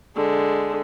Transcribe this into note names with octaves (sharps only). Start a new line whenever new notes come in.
D3 G#3